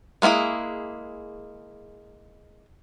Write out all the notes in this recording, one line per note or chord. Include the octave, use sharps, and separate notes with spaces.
G#3 A#3 C#4 E4 G#4